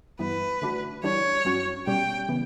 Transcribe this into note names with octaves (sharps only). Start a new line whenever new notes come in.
G2 E3 B3 B4
D3 A3 D4 F#4
E3 G3 D4 C#5
G2 F#3 C#4 F#4
B2 G3 C#4 G4 G5
C#3 E3 B3